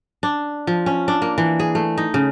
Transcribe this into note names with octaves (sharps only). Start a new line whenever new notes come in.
D4
F3
C#4
D4
A#3
E3
G#4
A3
D#4
C#3